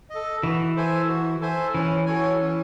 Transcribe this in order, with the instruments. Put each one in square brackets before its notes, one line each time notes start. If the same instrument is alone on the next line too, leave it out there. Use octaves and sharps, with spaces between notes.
[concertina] A4 D#5
[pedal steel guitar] E3 [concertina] F#4
[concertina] A4 C5 E5 G#5
F#4
A4 C5 E5 G#5
[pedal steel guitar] E3 [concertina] C#4
[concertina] F#4 A4 C#5 G#5
C#4